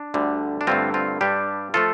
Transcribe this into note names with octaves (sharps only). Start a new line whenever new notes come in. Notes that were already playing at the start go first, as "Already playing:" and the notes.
Already playing: D4
D2 D3 G3
D4
G2 D3 A3 C4 F4
C4 F4
G2 G3 D4 G4
F3 A3 F4 A4